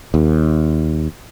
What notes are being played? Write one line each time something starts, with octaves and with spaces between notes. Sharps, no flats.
D#2